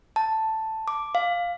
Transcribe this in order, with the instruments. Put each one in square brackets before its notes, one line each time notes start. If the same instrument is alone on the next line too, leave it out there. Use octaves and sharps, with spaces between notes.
[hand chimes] A5
D6
F5